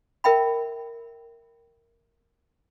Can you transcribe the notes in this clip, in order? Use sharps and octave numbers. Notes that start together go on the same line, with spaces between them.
A#4 E5 G5 B5